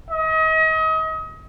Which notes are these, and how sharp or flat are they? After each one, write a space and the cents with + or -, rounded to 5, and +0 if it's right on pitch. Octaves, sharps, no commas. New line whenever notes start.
D#5 +35